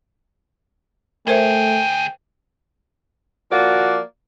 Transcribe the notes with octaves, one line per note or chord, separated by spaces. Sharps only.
D2 A3 G#4 A#4 C5 E5 G5
F3 A#3 F#4 D5